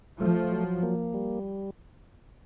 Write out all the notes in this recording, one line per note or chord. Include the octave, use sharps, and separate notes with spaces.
F3 A3
F#3
A#3
G3